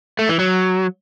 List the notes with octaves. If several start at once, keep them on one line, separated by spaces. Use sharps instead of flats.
A3
E3
F#3